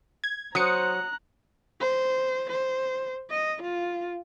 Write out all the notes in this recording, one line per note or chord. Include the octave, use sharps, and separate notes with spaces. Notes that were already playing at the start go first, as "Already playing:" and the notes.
G#6
F#3 C5 A#5 D#6 F#6 C#7
C5
C5
D#5
F4